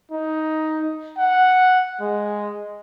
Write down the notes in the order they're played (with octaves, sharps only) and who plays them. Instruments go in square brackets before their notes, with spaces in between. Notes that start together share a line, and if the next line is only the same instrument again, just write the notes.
[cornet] D#4
F#5
G#3